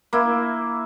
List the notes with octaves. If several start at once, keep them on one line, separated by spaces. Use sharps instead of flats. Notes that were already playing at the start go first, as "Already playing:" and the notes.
A#3 E4